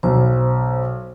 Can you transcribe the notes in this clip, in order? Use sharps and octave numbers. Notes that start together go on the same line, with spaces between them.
B1 C5